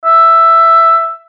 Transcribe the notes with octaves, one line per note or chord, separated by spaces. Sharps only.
E5